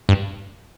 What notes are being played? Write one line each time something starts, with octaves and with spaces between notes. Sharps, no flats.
G2